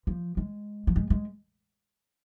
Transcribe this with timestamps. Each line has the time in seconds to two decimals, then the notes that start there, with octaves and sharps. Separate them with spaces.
0.07 F3
0.37 G#3
0.87 F3
0.96 G#3
1.10 G#3